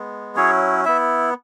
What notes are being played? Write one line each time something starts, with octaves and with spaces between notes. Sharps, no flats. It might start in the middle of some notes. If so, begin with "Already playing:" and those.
Already playing: G#3 B3
F#3 C#4 E4 G#4 C#5
B3 E4 E5